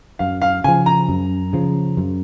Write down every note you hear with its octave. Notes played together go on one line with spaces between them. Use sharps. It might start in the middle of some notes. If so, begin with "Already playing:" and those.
F#2 F5
F5
C#3 F3 G#5
A#5
F#2
C#3 F3
F#2